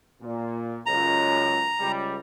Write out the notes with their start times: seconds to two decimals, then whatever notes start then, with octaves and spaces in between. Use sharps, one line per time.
0.22 A#2
0.86 C#2 F#2 A#5
1.80 C#2 G3